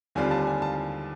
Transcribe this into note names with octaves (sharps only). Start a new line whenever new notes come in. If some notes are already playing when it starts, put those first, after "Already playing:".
D#2 D3 G3 C4 F4 G#5
A5
G#5
A5